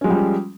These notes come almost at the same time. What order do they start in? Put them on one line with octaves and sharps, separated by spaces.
C#4 G#3 F3 G3